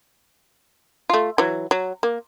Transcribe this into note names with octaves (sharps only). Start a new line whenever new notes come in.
A3 F4
E3 F#3
F#3
A#3